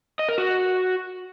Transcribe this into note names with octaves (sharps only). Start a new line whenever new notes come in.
D#5
A#4
F#4